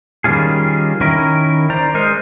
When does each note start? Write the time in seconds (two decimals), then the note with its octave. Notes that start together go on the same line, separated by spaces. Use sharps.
0.24 D#3 G3 C#4 F4 G#4
1.01 D#3 C#4 E4 A#4
1.70 C5 D5 A#5
1.94 G#3 D#4 A#4 C5